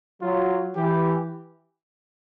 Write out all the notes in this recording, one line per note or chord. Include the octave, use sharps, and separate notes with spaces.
F#3 F4
E3 G4